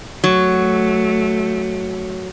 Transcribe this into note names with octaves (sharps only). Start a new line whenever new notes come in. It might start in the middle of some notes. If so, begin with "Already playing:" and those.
F#3 A3